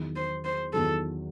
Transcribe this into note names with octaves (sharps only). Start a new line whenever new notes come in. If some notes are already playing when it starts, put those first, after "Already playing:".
Already playing: E2 D#3 F#3
C5
C5
E2 D#3 F#3 A4